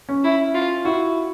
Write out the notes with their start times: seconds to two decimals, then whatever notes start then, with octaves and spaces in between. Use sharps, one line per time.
0.09 C#4
0.24 E4
0.54 F4
0.85 E4 F#4